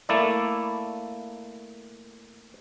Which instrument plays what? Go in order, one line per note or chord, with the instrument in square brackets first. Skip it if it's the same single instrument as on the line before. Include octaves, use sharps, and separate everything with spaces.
[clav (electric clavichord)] A3 A#3 E4 D5